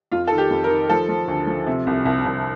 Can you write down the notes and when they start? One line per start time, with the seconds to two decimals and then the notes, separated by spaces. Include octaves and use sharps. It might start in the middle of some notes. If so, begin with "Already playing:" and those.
0.12 F2 F4
0.27 D#3 A4
0.38 G4
0.50 F2
0.64 A#4
0.70 D#3
0.89 F3 A4
1.09 F3
1.28 D2
1.47 F3
1.66 C3
1.87 C2
2.05 C2
2.26 C2